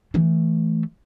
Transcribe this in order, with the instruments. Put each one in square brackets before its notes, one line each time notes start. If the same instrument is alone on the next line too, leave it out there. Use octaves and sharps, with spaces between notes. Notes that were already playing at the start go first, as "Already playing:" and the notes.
[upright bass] E3 A3